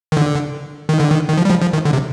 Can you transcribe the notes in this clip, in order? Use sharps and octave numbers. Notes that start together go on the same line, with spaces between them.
D#3
D3
D#3
D3
D#3
D#3
F3
G3
F3
F3
D#3
D3
C3